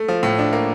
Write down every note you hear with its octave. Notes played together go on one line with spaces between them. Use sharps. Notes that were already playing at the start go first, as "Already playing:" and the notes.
Already playing: A3
F3
A2
D4
A#3